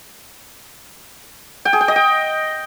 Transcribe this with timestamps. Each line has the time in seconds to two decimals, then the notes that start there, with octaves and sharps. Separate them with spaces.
1.65 G5
1.73 G#4
1.81 G5
1.88 D#5
1.96 G5